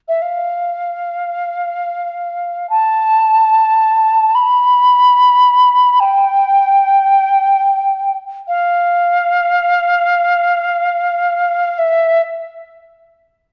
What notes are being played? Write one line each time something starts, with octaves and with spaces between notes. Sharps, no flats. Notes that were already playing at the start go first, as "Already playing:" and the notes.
E5
F5
A5
B5
G5
F5
E5